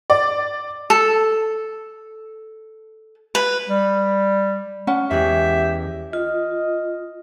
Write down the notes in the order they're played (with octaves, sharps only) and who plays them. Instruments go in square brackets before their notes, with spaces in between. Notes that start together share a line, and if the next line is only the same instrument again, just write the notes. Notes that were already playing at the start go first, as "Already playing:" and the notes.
[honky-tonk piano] D5
[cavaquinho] A4
B4
[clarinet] G3
[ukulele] C#4 F#5
[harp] E2 G#3 [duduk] G4 [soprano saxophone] E5
[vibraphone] F4 [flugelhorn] D#5